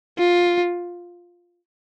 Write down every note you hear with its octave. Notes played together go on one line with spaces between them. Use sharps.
F4